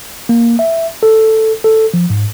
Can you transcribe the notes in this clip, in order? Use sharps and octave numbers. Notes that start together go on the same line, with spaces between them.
A#3
E5
A4
A4
F3
G#2